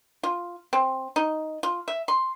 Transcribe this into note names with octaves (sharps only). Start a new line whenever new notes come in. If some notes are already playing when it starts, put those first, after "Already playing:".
F4
C4
D#4
F4
E5
C6